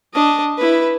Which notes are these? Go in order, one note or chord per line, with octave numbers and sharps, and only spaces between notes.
D4 D#5
E4 B4